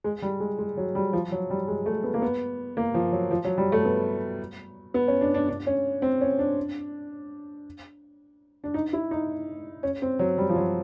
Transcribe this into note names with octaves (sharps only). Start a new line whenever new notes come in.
G#3
G3
G#3
G#3
F#3
G3
F3
F#3
G3
G#3
A3
B3
A#3
B3
A#3
F3
F#3
F3
F#3
G3
A3
B3
B3
C#4
D4
D4
D4
C#4
C4
C#4
D4
D4
D#4
E4
D#4
C#4
C4
F#3
G3
F3
F#3